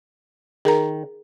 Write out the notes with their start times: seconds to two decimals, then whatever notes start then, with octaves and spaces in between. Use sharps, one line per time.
0.65 D#3 G#4 A#4 A#5